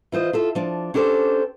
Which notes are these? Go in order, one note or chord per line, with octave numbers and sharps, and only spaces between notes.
E3 F4 C5 D#5
F4 A4 E5
F3 D4
C#4 D4 G4 A4 C5